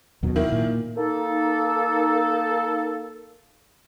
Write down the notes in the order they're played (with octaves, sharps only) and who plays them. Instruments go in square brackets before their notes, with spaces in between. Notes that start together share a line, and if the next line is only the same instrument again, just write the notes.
[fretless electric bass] D#2 B2 F#3
[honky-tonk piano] D#3 A#3 E4
[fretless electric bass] A#2
[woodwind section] A#3 D#4 A4